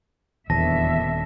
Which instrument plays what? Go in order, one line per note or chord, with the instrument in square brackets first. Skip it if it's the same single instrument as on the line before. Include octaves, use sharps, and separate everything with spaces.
[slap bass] D#1 [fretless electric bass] E2 [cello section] B2 D3 E5 [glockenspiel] A5 A#6